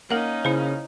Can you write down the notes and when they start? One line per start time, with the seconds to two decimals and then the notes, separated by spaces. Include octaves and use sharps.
0.10 A#3 C#4 D#4 A#4 F#5
0.45 C#3 E4 C5